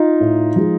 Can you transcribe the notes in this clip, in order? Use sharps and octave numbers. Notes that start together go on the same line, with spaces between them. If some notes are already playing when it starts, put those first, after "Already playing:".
Already playing: D#4 F4
A2
F3 G#3